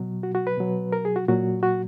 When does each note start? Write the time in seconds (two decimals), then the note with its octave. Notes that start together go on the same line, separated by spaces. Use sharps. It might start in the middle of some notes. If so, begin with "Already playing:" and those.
Already playing: B2 F#3
0.23 F#4
0.35 F#4
0.47 B4
0.57 B2 F#3
0.92 A#4
1.05 G#4
1.16 F#4
1.28 A#2 F#3 F#4
1.63 F#4